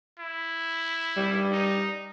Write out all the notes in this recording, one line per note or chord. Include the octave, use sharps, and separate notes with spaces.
E4
G3
D#4